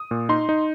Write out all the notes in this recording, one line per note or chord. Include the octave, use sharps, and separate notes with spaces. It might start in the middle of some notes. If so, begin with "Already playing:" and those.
Already playing: D#6
A#2
D#4 C6
D#4